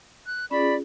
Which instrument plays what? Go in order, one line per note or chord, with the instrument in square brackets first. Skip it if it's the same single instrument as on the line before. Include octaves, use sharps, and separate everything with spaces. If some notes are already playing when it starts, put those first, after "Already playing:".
[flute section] F#6
[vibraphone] C#4 F4 G#4 [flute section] D5 B5